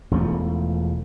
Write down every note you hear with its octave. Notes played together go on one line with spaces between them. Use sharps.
E1 E2 F3 A3